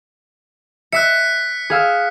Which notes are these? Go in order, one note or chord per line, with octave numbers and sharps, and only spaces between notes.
E5 E6 F#6 B6 C#7
G#4 F5 E6